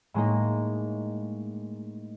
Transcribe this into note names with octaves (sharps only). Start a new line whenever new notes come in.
A2 G#3 A#3 D#4